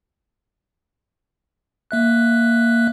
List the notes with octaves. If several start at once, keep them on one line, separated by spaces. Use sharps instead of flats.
A#3 E5 F#6